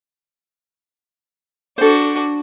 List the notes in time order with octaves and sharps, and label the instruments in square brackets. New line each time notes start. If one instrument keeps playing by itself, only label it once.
[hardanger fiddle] D4 F#4 [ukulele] A4 C5